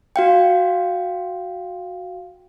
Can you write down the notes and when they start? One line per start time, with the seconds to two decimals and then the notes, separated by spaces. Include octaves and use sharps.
0.16 F#4 F5 G5